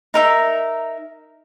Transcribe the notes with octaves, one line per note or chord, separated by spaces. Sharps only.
D#4 A#4 E5